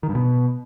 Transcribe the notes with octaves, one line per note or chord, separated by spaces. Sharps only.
D#3
G2
B2